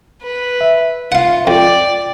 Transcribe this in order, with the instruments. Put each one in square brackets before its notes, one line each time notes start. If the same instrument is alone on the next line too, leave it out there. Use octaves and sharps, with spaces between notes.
[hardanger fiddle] B4
[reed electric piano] E5
[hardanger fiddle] F4 [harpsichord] F5 F#5
[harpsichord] F2 [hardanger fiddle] D5 [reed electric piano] G5